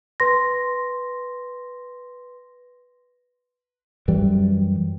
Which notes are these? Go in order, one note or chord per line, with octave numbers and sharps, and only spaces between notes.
B4 C6 A#6
F#2 E3 G3